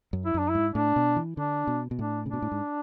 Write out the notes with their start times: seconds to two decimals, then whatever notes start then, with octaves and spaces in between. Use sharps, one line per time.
0.13 F#2
0.25 E4
0.34 F#2 D4
0.50 E4
0.55 G#2
0.75 A2 D4
0.96 B2
1.16 E3
1.37 D3 D4
1.67 B2
1.91 B2
1.99 A2 D4
2.26 C#3
2.29 B2 D4
2.42 A2
2.52 G#2